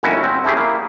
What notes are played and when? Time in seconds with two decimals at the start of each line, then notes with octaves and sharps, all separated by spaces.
0.03 G1 D#2 C#4 E4 F#4
0.24 C4
0.44 A3 C#4 E4 G4 G#4
0.57 A#3 E4